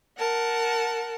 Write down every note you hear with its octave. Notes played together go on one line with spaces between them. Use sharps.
A#4 F#5 A5